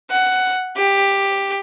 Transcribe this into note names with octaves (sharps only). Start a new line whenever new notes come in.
F#5
G4